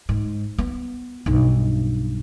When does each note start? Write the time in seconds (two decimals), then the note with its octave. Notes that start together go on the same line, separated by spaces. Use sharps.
0.09 G#2
0.59 B3
1.26 B1 G2